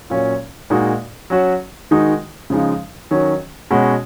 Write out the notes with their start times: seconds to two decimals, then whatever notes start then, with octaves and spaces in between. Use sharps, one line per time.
0.10 A#2 F#3 C#4 F4
0.70 A#2 G#3 D#4 F#4
1.30 F#3 C#4 F#4
1.91 D#3 G#3 D#4 F#4
2.50 C#3 F3 G#3 D#4
3.11 D#3 F#3 C#4 F#4
3.71 B2 G#3 C#4 F#4